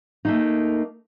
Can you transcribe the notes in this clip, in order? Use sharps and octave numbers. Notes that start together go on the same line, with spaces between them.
A3 A#3 D#4